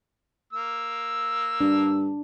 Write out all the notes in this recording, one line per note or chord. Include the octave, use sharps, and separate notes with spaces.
A#3 E6
G2 D4